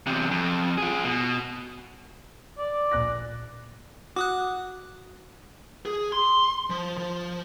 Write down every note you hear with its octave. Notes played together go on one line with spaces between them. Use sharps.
E2 C3
F2
F4 G#4
B2
D5
A#1 F#6 A#6
F#4 D6 D#6 F#6
G#4
C6
F3
F3